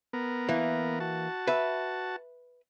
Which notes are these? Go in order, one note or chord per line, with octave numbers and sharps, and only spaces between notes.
B3 A#4
E3 A#3
F#4 A5
B4 E5